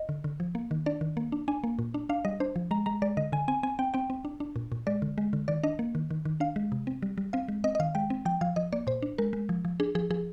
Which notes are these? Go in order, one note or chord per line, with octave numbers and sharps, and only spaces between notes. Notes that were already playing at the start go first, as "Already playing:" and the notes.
Already playing: D#5
D3
D3
F3
A#3
D#3
D4 D5
D#3
A#3
D4
D4 G#5
A#3
A#2
D4
D4 F5
G3 D#5
D4 C5
F3
G#3 A#5
G#3 A#5
G#3 D5
D3 D#5
D3 G#5
C4 G#5
C4 G#5
C4 G5
C4 G5
C4
D4
D4
A#2
A#2
G#3 D5
D3
G#3
D3
D#3 D5
D4 D#5
A#3
D#3
D#3
D#3
D4 F5
G#3
C3
C4
G3
G3
C4 F5
G#3
C4 D#5
D#5
D#3 F5
G#3 G5
C4
F3 G5
F3 F5
F3 D#5
A#3 D5
A#2 C5
D4
G#3 A#4
G#3
F3
F3
D4 G#4
F3 G#4
F3 G#4